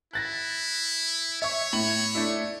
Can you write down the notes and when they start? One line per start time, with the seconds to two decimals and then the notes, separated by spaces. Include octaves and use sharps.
0.14 E4 F#6 A6 A#6
1.42 C#5 E5 C#6
1.73 A2 F#7
2.15 A3 D4 E4